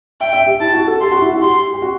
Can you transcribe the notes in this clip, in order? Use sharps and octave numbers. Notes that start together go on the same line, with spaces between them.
E5 G5
E5
G4
E4 A5
F#4
A4
G4 C6
F#4
E4
F#4
G4 C6
G4
F#4